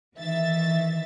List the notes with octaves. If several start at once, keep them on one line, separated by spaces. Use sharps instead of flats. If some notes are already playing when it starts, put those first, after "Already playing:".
D#3 E3 E5 A6